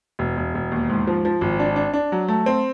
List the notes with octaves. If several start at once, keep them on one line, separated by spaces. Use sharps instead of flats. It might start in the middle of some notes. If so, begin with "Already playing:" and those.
E1
E1
E1
D#2
G#2
F3
F3
G#1
D4
D4
D4
F#3
A3
C4